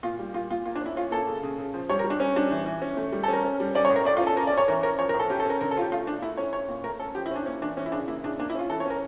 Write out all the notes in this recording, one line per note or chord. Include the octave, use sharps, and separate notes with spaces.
A#2 F4
G3
A#2 F4
A#2 F4
A#3 F4
D4
C#4 E4
C#4 F4
A#3 A4
C#3
C#3
C#3
F3
G3 C#5
A#4
G3
D4
C#4
G3 D4
E3
E3
C#4
A3
G3
A4
C#4 A#4
C#4
G3
C#4 D5
C#5
A2
A#4
A2 D5
F4
C#4
A4
C#4 A#4
D5
C#4
C#5
E3 A#4
C#4 A#4
F3 C#5
A#4
A2
A4
C#4 G4
A4
C#4 A#4
D3 A#4
A4
C#4 F4
G4
A3 F4
A3 D4
A3 E4
C#4 C#5
C#4 C#5
A#2
A3 A#4
C#4 A4
F3 G4
E4
C#4 D4
A#3 C#4
E3 D4
E3 C#4
E4
C#3 D4
A#3 E4
C#3 D4
A#3 D4
E4
C#4 F4
E3 A4
C#5
C#4 A#4